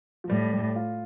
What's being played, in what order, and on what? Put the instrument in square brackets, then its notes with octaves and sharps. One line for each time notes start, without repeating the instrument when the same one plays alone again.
[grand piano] F3
[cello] A2 [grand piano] G3
[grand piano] G3
F4